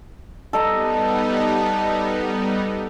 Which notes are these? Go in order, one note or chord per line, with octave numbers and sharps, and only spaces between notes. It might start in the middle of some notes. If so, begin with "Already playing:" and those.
G3 B3 D#4 A4 D#5 A#5